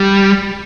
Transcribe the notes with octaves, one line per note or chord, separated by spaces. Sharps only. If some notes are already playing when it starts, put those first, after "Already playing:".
Already playing: G3